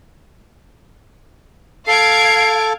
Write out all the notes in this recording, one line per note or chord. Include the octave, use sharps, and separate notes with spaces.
A4 F5 G#6 C7 D7